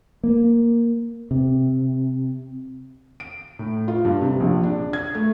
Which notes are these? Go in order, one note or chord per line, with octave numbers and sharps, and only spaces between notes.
A#3
C3
D7
A2
F4
G2
C3
A#1
D4
G#6
A3